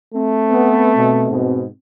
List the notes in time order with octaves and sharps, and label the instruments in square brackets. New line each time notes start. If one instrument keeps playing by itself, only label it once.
[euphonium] A3 [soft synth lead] C4
[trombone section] B3
B2
G#2 B2